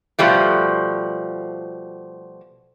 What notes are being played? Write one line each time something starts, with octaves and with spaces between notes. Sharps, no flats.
B2 F3 G3 A3